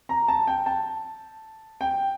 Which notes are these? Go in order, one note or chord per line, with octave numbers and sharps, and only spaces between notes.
A#5
A5
G5
A5
G5